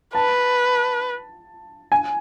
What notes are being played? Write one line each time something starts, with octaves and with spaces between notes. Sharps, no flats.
B4 A5
G#5